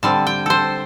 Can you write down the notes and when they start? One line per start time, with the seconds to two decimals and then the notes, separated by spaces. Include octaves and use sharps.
0.03 D3 G3 C4 A5
0.27 G5
0.46 A4 C5